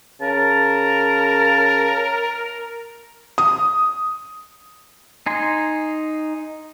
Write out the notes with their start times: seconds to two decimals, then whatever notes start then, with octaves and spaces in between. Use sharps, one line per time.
0.22 C#3 A#4 A5
3.38 D#6
5.26 D#4 G#5 C6